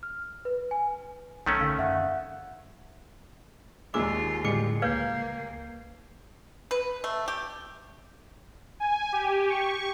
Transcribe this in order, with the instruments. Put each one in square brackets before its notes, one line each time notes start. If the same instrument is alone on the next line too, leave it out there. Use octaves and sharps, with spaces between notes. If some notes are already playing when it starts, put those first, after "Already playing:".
[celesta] F6
B4
G#5
[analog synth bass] B1 [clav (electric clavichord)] D#3 A3 C#4
[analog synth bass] D3 [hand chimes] F5
[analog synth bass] F#2 [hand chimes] E5 F#5 F#6
[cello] D#2 F4 [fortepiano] A#2 G#3 E6 [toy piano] D6
[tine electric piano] A2 D3 C#7 [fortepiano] G3 G#3 [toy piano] D6
[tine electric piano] C#2 G6 G#6 [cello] A#3 [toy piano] B4 C#5 F5
[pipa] B4
A3
G4
[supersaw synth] G#5
G4
C#6